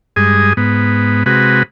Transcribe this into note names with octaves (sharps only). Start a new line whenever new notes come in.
G2 G#3 G#4 D#6
G#2 B3
C3 G#3 F#4 B4